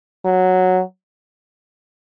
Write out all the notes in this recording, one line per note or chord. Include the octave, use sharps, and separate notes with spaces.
F#3